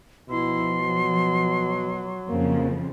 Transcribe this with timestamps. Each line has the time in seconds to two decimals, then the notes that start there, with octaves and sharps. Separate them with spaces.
0.30 B2 F3 E4 C6
0.79 F#3
2.29 F2 C#3 F3 A#3